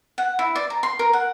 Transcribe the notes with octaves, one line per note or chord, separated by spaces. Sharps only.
F#5
E4
D5
A#5
C6
A#4
F#5